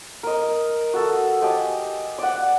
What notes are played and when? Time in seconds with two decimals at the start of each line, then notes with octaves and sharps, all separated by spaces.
0.23 A#4 D#5
0.93 F#4 A4
1.42 G4 D#5 G#5 A5
2.18 D5 F#5